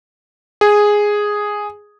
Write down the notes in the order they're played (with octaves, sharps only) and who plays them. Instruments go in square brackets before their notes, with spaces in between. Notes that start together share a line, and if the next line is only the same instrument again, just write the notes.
[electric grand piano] G#4